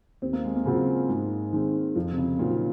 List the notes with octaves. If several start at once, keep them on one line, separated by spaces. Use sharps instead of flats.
D#2 C4
A#3
G#3
A#3
C#3 F#3 C4 F4
G#2
D#3 G#3 C4
F2 F3
C3
C#3
A#2 D#3 F#3 C4 F4